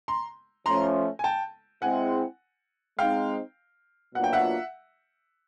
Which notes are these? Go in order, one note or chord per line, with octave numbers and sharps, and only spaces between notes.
A#5 C6
F3 A3 C#4 A#5 C6
G#5
G5 A5
G#3 C4 E4 F#5 G#5
G#3 C4 D#4 F5 G5
B2 F#3 A#3 D4 F4 F#5
G5
E5 F#5